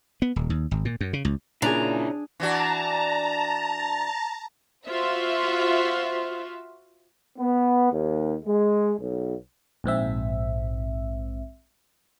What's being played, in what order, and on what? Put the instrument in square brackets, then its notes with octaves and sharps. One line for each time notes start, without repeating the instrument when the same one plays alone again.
[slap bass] B3
D#1
D#2
G#1
A#2
F#2
C#3
C#2
[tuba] A#2 [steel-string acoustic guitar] C#3 A#5 [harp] D4 G#4 [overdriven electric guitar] E4 D5
[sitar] E3 D4 F#4 [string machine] A5 A#5
[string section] F4 F#4 C5 E5
[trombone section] B3
D#2
G#3
B1
[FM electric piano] A#1 G#2 C4 E5